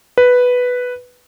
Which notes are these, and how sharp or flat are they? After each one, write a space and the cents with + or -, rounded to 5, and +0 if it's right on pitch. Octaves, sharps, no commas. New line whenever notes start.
B4 +0